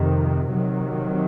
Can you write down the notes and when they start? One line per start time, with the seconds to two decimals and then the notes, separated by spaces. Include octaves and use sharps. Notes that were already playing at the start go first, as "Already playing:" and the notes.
Already playing: F2 C3 D#3
0.54 C3 D#3 F#3